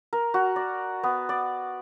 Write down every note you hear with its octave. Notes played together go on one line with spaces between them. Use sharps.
A#4
F#4
D5
B3
D5